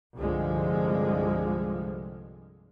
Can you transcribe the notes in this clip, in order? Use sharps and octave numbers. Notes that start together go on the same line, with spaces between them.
C2 G2 D3 F3 G#3